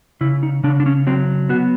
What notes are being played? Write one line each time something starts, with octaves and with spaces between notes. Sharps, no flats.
C#3 E4
D#4
C#3 D4
D4
C#4
F#3 C4
B3 F#4